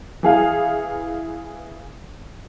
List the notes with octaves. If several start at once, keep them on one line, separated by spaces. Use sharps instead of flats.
E3 G#4 F5